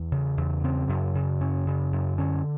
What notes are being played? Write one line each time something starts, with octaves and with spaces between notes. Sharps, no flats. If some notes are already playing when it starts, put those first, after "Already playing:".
Already playing: E2
C#3
E2
C#3 C4
F#2
C#3
F#2 C#4
C#3
F#2
D3 C#4